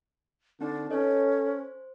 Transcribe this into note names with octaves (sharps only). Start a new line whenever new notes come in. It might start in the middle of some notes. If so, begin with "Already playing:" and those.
D3 C4 D4 D#4 D5
C#4 A4 B4 C#5 D#5
C5